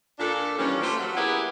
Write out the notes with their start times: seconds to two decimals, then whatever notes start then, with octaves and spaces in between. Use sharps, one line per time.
0.19 A#2 D4 A4
0.58 D#3 E3 G3 A#3 C#4
0.81 A3 A#3 F4 G4 C5
0.99 F#3
1.15 A#3 B3 E4 G4 G#4 B4